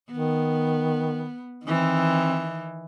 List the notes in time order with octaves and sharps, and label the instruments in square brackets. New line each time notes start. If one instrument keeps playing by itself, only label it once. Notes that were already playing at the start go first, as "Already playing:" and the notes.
[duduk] D#3 [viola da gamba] B3
[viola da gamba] D#3 E3 [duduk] C4